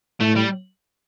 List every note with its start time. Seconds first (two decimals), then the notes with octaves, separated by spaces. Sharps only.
0.20 A2 A3
0.36 G3